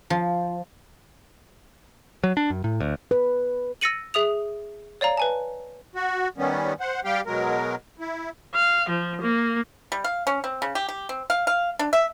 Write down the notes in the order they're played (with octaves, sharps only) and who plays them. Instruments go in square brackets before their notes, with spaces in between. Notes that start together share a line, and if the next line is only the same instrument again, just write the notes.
[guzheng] F3
[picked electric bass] F#3
D4
F#2
A2
D2
[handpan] B4
[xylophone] E6 A6 A#6 C#7 D#7 F#7
G#4 E5 D#6 F7
C#5 D5 F5 A#5
B4 G#5 A5
[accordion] F#4
D#3 G3 B3 C#4
C5 F#5
G3 G4 F5 G5
B2 F#3 G#3 A#4
E4
[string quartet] F5
F3
A#3
[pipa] G3
F5
C#4
C4
C#3
G4
G4
C4
F5
F5
D4
E5